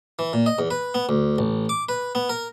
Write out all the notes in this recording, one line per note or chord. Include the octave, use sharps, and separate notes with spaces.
E3
A#2
D#5
E2
B4
B3
D2
A1
D6
B4
B3
A#4